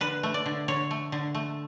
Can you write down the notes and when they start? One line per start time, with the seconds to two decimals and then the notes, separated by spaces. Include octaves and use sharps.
0.01 D3 B4
0.23 A3
0.34 D5
0.46 D3
0.68 D3 C#5
0.91 A3
1.12 D3
1.35 A3